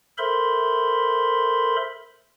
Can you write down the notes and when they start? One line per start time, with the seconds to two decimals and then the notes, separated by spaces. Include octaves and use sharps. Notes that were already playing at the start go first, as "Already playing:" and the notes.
0.18 A4 A#4 C5 E5 B5 C6